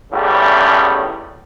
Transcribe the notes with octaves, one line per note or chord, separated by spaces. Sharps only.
G#1 E2 A2 C#3 G3 C#4